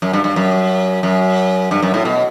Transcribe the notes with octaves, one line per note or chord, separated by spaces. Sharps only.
F#2
G2
G2
F#2
F#2
G2
F#2
A2
B2